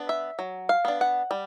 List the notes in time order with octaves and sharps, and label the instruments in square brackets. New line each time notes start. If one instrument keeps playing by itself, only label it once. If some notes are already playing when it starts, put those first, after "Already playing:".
Already playing: [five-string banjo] B3 D4
E5
F#3
F5
B3 D4
F#5
G3